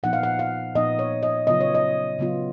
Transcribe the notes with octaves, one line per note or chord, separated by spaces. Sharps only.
A#2 F3 B3 D#4 F#5
F5
F#5
F5
A#2 F3 B3 D#4 D#5
C#5
D#5
C#3 F#3 B3 F4 D#5
C#5
D#5
C#3 F#3 B3 F4